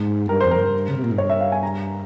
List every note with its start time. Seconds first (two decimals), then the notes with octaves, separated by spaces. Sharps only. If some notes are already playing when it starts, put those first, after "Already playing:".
Already playing: G#2
0.29 G2 A#4
0.40 F2 C5
0.51 A#4
0.59 G2
0.89 C#3
0.97 C3
1.04 A#2
1.11 G#2
1.18 G2 C#5
1.29 E5
1.41 F5
1.52 G#5
1.63 A#5